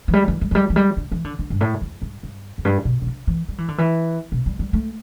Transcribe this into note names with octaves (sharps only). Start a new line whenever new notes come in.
E3
G3
E3
G3
E3
G3
E3
G3
D3
E3
D3
D3
G2
A2
E2
G2
G2
E2
G2
B2
B2
D3
E3
G3
E3
D3
E3
B2
G3
G3
A3